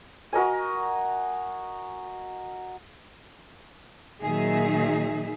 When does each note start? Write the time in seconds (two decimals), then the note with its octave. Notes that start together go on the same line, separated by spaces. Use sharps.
0.32 F#4 A#4 D#5 G#5
4.23 A#2 D#3 F#3 D#4 G#4 E5